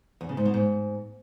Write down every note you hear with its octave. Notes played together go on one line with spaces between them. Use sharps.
E2
C#3
G#2
B2
G#2